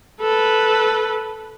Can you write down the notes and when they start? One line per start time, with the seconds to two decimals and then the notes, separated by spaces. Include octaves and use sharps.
0.21 A4 B4